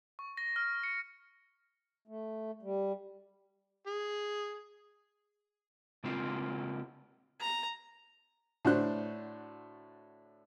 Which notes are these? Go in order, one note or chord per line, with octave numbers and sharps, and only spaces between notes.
C#6
A#6
F6
C#7
A3
G3
G#4
C#3 G#3 A#3 C4 F4
A#5
A2 D3 D4 F#4 C5 F#6